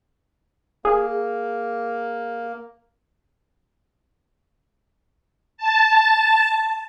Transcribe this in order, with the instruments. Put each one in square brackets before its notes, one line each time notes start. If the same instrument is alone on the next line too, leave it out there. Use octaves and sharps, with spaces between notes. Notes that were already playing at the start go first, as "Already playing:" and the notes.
[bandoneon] A#3 [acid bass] G#4
[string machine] A5